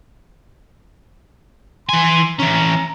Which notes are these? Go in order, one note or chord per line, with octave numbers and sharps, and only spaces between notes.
E3 G#5 C6
E3 C#4 A#5